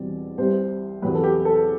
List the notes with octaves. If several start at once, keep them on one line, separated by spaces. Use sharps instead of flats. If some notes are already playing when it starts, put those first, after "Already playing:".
Already playing: E2 B2 G3 C4 D5
C2 C3 G3 C5
E2 C3 F#3 B4
A4
G4
A4